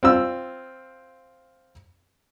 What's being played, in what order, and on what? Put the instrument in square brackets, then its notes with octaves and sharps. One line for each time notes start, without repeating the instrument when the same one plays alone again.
[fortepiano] C4 F4 E6